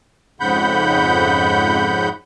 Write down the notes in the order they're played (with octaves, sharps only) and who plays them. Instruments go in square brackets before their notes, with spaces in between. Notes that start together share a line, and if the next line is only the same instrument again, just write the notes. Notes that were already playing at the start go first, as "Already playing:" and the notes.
[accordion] F2 G#2 C#3 F#5 B5 G6